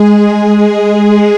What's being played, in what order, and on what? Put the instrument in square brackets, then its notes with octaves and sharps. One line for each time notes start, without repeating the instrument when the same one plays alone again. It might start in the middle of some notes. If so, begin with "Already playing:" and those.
Already playing: [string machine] G#3 G#4